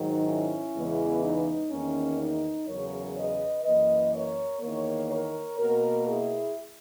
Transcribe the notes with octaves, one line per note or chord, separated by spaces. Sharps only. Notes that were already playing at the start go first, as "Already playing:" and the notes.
Already playing: G#2 D#3 F#3 D#4
C#4 E4
E2 C#3 E3 G#3 B3
D#4
E2 D#3 A#3 C#4
D#4
E2 C#3 F#3 A#4 C#5
B4 D#5
F#2 E3 A#3 B4 D#5
A#4 C#5
E2 D#3 A#3 A#4 C#5
A#4 C#5
B2 A#3 F#4 A#4
E4 G#4